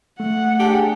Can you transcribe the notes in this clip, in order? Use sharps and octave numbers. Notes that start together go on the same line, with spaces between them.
A3 F#5
D4 G4 G#4 A5